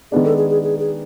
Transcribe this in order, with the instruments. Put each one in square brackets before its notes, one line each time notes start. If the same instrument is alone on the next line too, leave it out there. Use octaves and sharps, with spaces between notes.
[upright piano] D#3 G#3 B3 D4 [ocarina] G#4
[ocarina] A4
G#4
G#4
G#4
G#4